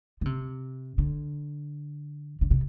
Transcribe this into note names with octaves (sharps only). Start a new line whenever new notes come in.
D3
C3
D3
D3
C3